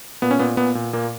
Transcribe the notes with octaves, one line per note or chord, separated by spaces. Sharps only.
A#2 B3
C#4
A#2 B3
A#2 B3
A#2
A#2 A#3